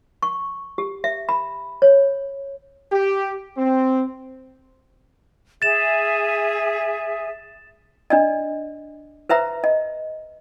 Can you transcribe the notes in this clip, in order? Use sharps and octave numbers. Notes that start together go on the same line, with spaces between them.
C#6
G4
E5
B5
C#5
G4
C4
G#4 E5 A6 E7
D4 D5 D#5
B4 C5 E5 A#5
D#5